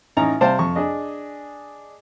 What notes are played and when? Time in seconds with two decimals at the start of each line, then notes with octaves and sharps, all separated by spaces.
0.17 A1 C#4 D#4 A#5
0.41 C3 G3 C5 F5 G5 A5
0.59 F2 C#6
0.76 D4 G#4 D#5